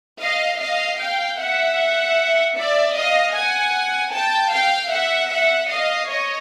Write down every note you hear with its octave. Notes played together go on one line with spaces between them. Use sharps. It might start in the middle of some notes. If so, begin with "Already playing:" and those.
D#5 F5
D#5 F5
F5 G5
E5 F#5
D5 E5
D#5 F5
F#5 G#5
G5 A5
F5 G5
E5 F#5
E5 F#5
D#5 F5
C#5 D#5